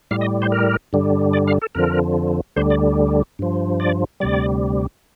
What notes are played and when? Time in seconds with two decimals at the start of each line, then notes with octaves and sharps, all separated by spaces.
0.11 A2 G3 F5
0.21 D#5
0.42 C5
0.52 A#4
0.93 G2 D3 G3
1.33 D5
1.47 F5
1.61 A4
1.75 F2 D3 F3 A#4
2.56 D2 D3 G3 C5
2.70 D5
3.39 G2 F3
3.80 D5
4.20 D2 C3 G3 D5